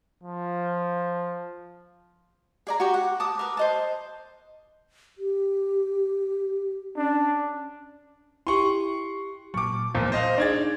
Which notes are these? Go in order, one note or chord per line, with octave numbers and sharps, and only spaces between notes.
F3
G#4 D5 A#5
F#4 G4
F#5
A5 D6 D#6
A#4 B4
C5 D#5 A5
G4
C#4 D4
E4 G4 C6 C#6
A#2 F#3 C#6 D6
E1 A#2 F3 G6
C5 D#5 F5
D4 D#4 G#4 D5 G#6 A6